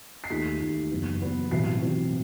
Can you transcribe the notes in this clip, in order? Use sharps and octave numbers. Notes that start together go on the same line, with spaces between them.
C7
D#2 D#3 A3 B6
D#2 D#3 A3
F#1 F#2 E3 B3
F#1 F#2 E3 B3
B1 A2 E3 G3 C4 C7
B1 A2 E3 G3 C4